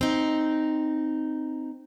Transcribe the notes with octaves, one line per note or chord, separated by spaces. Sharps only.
C4 D#4